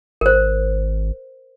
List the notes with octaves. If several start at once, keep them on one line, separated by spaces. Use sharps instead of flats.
G#1 A#4 C5